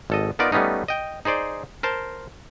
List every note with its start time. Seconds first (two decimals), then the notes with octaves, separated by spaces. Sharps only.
0.10 G#1 A4 D#5
0.39 B3 D#4 F4 A#4 D5
0.52 G3 A3 B3 C#4 D#4
0.88 D#5 G5
1.25 D#4 G#4 C5 D5
1.83 A#4 C5 A5